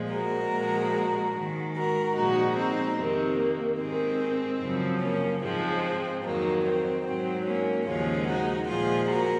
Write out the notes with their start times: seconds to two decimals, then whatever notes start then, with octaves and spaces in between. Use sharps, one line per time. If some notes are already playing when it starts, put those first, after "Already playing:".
Already playing: A#2 F3 G#3
0.11 F#4 A#4
0.52 A#2 F3 G#3
1.34 G#2 D#3 G#3
1.74 F#4 A#4
2.15 A#2 F3 G#3 D#4 F#4
2.56 C4 D#4
2.97 F2 C3 D#3 C4
3.38 A#3
3.79 G#2 D#3 G#3 C4
4.60 F#2 C#3 F3
5.00 A#3 C#4
5.42 G#2 F3 G#3 C4
6.23 F2 D#3 F#3 A#3
6.64 C4
7.04 G#2 F#3 C4
7.46 A#3 C#4
7.86 D#2 C#3 F3 G#3 C#4 F4
8.27 D#4 F#4
8.68 A#2 F3 G#3 F4 G#4
9.09 F#4 A#4